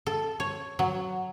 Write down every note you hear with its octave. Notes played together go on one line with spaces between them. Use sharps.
A4
C#5
F#3